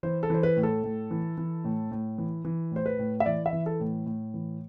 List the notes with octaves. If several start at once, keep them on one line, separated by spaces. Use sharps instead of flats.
E3 C5
A4
E3 C5
B4
A2
A4
A2
E3
E3
A2
A2
E3
E3
A2 C5
B4
A2
E5
E3 D5
E5
E3
A4
A2
A2
E3